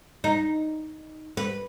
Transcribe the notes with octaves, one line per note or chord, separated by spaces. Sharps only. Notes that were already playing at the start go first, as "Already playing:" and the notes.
D#4
B4